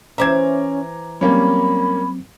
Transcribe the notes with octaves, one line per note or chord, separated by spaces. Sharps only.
E3 C#4 C5 E5 A#5 D6 G#6
F#3 G3 A#3 C4 C#4 B5